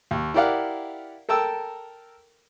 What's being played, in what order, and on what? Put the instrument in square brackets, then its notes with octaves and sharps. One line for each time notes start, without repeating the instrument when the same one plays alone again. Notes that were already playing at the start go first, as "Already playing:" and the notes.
[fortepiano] D#2
E4 G4 A#4 D5 F5 F#5
A4 A#4 G5 A5 E6